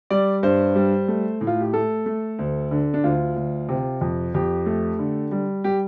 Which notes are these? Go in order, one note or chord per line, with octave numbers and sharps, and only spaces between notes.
G3 D5
G2 C5
G3
A3
A2
F4
G4
A3 A4
A3
D2
D3
D4
D2 F4
D2
C3
F2
F2 G4
A3
D3
G3
G3 G4